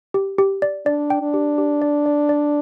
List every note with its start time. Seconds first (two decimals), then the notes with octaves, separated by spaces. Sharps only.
0.14 G4
0.38 G4
0.62 D5
0.86 D4 D5
1.10 G5
1.22 D4
1.34 G4
1.58 G4
1.82 D5
2.06 D5
2.29 D5